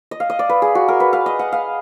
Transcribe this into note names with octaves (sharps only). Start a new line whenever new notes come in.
D#5
F5
D#5
D5
B4
G#4
F#4
A#4
B4
F5
D#5
F#5
F5